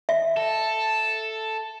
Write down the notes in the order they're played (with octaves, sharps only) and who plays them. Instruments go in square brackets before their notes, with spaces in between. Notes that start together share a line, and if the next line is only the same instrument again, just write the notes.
[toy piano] E5
[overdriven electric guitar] A4